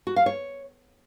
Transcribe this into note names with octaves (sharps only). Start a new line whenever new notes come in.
F#4
F5
C#5